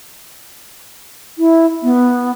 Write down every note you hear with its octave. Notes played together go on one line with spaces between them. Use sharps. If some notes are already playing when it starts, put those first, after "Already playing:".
E4
B3